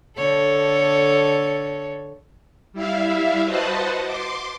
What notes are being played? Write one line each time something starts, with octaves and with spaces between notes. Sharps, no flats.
D3 A4 C#5
G3 E4 E5 F5
F#4 B4 C5 D#5 F#5 A5
C6 D6